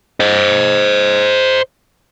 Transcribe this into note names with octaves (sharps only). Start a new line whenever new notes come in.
C5 D#5